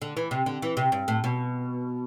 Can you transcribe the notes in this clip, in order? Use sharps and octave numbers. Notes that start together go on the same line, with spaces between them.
D3
E3
C3
D3
E3
C3
G2
A2
B2